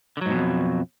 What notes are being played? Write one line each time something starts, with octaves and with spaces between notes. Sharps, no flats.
F2 G#2 B2 D3 F#3